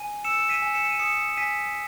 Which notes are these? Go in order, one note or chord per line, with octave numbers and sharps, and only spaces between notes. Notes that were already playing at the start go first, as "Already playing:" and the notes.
Already playing: G#5 D#7
E6 C#7 E7
E7
B6 D#7
G#5
C#7 E7
D#7
D#6 C#7 E7
G#5 B6 D#7